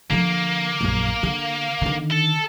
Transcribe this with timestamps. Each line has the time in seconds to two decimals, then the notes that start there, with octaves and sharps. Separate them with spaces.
0.10 D3 F3 A#3
0.81 A#1 F#2
1.23 D3
1.81 D3 D#3
2.11 A4